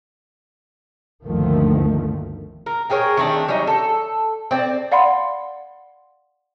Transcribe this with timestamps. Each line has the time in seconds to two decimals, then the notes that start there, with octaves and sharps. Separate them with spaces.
1.25 G1 D2 D#3 F3 A3 A#3
2.66 A#4
2.90 G4 G#4 A#4 C#5
3.17 D#3 A3 C4 D4
3.48 F#3 G3 C#4 D#4
3.67 A4
4.51 C4 D5
4.92 D5 F5 F#5 B5 C6